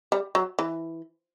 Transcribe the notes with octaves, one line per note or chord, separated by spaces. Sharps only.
G3
F#3
E3